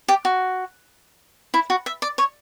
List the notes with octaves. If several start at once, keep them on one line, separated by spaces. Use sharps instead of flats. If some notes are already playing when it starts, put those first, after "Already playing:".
G4
F#4
E4
F#4
E5
D5
C#5